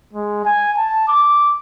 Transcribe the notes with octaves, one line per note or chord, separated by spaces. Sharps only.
G#3
G#5
A5
D6